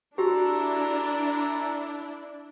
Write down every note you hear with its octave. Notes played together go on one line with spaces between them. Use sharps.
D4 E4 F#4 G4 A4 A#5